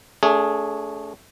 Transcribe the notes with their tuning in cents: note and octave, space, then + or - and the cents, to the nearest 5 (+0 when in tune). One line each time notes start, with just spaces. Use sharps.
A3 +0 D4 -45 G#4 +0